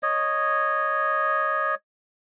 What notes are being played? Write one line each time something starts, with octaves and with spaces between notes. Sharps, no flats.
C#5 D#5